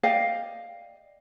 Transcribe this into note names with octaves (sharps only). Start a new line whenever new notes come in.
D5 D#5 F5 G5